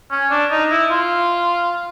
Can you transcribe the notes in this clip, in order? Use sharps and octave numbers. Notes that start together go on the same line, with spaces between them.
C#4
D4
D#4
E4
F4